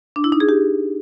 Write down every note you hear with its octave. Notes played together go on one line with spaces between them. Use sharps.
D4
E4
D#4
G#4
G4